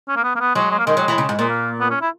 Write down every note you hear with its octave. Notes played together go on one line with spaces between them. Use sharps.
C#4
A#3
B3
A#3
B3
F#3 G#3
G#3
A#3
D#3 G#3
F#3
E3
C#3
G#2
A#2 G#3
A#3
B3
C#4
E4